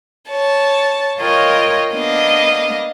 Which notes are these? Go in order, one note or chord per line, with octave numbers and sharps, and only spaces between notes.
C#5 A5
F4 A#4 C#5 D#5 G5
A#3 B3 D4 D#5 F5